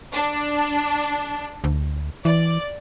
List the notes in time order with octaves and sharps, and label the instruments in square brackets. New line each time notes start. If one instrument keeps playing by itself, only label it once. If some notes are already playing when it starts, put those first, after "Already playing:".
[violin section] D4
[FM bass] D2
[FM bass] E3 [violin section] D5